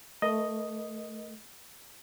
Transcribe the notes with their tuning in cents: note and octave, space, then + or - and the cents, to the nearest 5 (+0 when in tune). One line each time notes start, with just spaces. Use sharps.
A3 +0 A#4 +35 D#5 +0